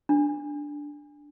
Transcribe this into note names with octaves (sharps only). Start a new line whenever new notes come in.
D4